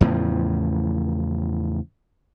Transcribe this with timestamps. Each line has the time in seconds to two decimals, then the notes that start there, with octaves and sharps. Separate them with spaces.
0.01 E2 A2 C#3 F3